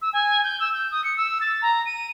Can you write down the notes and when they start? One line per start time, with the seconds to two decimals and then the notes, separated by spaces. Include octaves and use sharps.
0.01 E6
0.12 G#5
0.43 G6
0.59 E6
0.74 G6
0.91 D#6
1.04 C#7
1.16 E6
1.40 A6
1.62 A#5
1.85 D#7